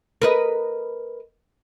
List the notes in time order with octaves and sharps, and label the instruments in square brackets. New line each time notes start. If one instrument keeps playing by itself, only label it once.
[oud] A#4 B4 D#5